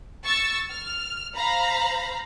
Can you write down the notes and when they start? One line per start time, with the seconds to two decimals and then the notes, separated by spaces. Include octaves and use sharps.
0.25 C#6 E6 A6
0.71 F6
1.36 C5 F5 A#5 B5